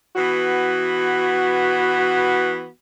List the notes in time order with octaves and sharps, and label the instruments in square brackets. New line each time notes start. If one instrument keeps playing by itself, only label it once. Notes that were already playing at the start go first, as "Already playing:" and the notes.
[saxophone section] E3 B3 F#4